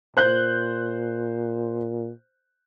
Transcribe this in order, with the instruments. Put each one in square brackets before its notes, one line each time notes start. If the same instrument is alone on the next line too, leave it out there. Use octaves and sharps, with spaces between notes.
[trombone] A#2 [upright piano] C5 F#6 G6